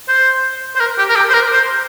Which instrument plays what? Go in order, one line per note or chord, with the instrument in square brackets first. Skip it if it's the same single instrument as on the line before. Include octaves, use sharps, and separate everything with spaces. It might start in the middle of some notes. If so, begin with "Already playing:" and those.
[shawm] C5
C5
A#4
G4
A#4
G4
C5
A#4
C5